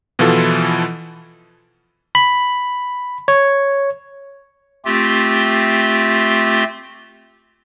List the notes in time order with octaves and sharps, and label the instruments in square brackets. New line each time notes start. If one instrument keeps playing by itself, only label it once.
[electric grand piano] B2 E3 F3 E4 F4 A4
[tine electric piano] B5
C#5
[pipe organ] A3 C4 F4 G4